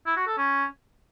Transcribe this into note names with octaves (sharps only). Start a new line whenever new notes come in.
E4
F#4
A4
C#4